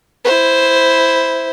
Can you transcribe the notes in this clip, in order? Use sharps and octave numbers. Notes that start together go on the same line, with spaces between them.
E4 C5